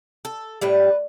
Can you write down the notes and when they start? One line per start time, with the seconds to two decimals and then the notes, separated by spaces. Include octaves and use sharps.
0.25 A4
0.61 A2 G3 B4